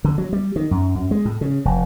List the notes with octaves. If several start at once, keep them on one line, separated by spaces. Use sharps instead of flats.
D3
F#3
G3
D#3
F#2
F#2
G#3
A2
C#3
F1